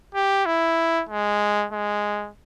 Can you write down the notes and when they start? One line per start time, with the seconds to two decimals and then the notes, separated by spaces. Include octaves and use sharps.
0.15 G4
0.46 E4
1.09 G#3
1.72 G#3